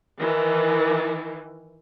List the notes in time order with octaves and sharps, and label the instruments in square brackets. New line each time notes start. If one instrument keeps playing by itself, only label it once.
[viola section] D#3 E3